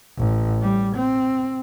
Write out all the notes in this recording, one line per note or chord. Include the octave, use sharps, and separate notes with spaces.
A1
G3
C4